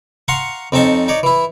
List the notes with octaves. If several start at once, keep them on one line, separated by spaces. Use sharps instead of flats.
F5 F#5 A#5 C6 C#6
F2 C4 C#4 D#4 A5 C#6
D#4 C#5 D5
E3 E4